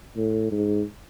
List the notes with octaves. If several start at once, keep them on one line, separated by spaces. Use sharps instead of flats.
A2
G#2